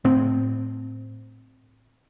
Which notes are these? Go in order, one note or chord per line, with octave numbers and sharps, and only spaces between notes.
A2 C4